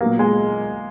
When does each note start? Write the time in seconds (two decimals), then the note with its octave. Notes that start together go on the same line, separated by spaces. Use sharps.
0.01 A#2 F#3 A#3 B3
0.19 G#3